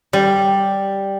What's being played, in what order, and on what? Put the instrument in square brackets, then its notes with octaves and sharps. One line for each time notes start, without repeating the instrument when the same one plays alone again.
[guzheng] G3